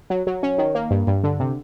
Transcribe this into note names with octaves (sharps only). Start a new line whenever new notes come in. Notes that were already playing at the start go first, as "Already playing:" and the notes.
F#3
F#3
C#4
D#3
A#3
G2
G2
D3
C3